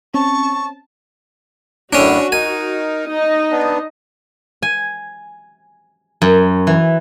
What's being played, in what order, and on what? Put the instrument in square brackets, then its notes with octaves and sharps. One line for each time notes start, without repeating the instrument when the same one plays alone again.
[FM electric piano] C4 C#4 [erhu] A5 [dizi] C#6
[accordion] F#2 A2 D3 [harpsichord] C#4 D4 [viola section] F#4
[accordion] D#4 A#4 [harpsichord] G#5
[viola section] D#4 D#5
[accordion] B3 D4
[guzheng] G#5
F#2
E3